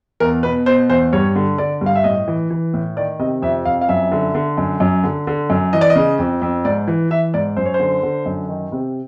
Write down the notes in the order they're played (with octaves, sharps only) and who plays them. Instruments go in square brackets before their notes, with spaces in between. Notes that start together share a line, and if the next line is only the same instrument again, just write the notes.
[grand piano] E2 A#4
B2 B4
B2 C5
E2 C5
G2 C#5
D3
D3 D5
G2
F5
E5
A2 D#5
E3
E3
A2
D#3 D5
C3 D#5
F2 E5
F2 F5
F5
F#2 E5
D3
D3
F#2
F#2
D3
D3
F#2
E3 D#5
D5
D#5
C#3
F2
F2
G#2 D5
E3
E3 E5
G#2 D5
F#2 C5
C#5
C5
D3
D3
F#2
D#3
C3